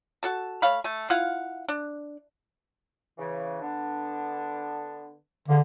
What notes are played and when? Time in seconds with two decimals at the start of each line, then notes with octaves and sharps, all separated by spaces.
0.23 F#4 A4 A5
0.62 A3 C#5 F5 B5
0.84 A3 G#5
1.10 E4 F4 F5 F#5
1.68 D4
3.18 C#3 E3
3.61 D3 B3 D4
5.48 E2 D3 F3 A#3